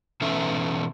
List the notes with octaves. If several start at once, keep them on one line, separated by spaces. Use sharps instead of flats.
B2 E3 C#4 D#4 A4 E5